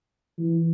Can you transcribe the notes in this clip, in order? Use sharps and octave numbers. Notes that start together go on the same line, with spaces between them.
E3